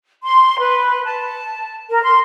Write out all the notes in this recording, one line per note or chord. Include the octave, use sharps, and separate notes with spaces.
C6
B4
A5
A#4
C6